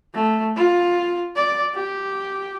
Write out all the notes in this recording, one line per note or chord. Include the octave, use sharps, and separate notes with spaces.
A3
F4
D5
G4